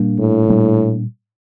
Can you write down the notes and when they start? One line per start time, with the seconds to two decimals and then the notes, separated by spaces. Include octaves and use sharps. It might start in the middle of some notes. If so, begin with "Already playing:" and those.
Already playing: A#2 G3 A#3 D4
0.20 A2
0.48 A#2 G3 A#3 D4